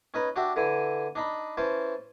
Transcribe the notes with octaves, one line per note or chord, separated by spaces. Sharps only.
C#4 D#4 B4
D4 F#4 G4 E5
D3 E3 G#5
D4 D#4 B5
E3 C#4 C5 A5